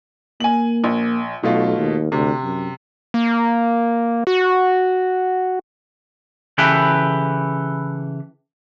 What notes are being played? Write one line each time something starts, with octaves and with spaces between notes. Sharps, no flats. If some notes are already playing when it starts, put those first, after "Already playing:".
A#3 G#5 F#7
A#1
B1 B2 A3 F4
D#2
D2 C3
F#2
A#3
F#4
C#3 E3 E4 G4 A4 B4